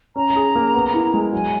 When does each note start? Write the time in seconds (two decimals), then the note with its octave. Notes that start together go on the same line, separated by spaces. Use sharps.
0.16 C#4 A#5
0.36 G#4
0.56 A#3
0.74 B3
0.94 E4
1.14 G#3
1.33 F#3 G#5